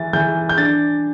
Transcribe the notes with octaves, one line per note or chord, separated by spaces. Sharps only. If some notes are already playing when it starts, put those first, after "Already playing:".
Already playing: E3 A6
E3 G6
G6
D4 A6